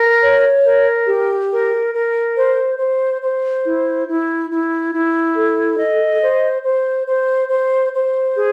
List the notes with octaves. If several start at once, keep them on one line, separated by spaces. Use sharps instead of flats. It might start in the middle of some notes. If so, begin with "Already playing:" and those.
Already playing: A#4
C#5
A#4
G4
A#4
A#4
C5
C5
C5
E4
E4
E4
E4
A4
D#5
C5
C5
C5
C5
C5
G#4